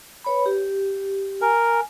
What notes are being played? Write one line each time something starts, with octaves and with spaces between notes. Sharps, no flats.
B4 C#5 B5
G4
A#4 G#5